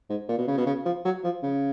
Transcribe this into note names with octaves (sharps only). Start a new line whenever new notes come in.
G#2
A#2
B2
C#3
B2
C#3
F3
F#3
F3
C#3